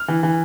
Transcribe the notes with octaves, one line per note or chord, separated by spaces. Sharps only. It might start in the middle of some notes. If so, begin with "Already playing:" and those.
Already playing: F6
E3
E3